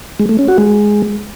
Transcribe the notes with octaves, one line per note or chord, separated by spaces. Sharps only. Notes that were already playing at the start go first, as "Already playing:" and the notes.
G#3
A3
C#4
F#4
G#3